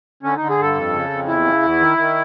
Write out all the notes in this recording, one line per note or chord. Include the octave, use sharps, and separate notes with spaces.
D3 C#4
D3 D#4
G#4
G2 A4
F2
C#3
F2
E2 E4
C#3
E2
D#3
D#3